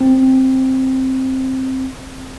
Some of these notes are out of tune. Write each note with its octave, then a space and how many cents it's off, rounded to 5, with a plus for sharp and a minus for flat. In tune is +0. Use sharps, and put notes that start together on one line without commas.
C4 +5